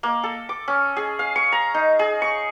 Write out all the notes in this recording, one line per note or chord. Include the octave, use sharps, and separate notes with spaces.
A#3
A4
D6
C#4
G#4
F5
C#6
A#5
D#4
G#4
C#6